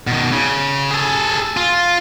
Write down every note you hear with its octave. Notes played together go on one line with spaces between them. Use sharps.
B2 D#3
C#3
G#4 A4
F4